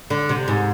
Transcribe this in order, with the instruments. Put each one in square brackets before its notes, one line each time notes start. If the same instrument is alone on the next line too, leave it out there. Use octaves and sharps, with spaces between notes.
[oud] D3
C3
G#2